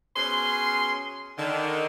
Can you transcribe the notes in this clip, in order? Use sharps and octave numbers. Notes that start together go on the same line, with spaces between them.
B2 C#4 G#4 C6
D3 D#3